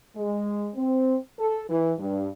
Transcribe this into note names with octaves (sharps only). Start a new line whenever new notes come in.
G#3
C4
A4
E3
G2